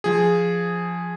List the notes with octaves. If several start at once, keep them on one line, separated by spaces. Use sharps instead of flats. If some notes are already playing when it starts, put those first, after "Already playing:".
F3 G#4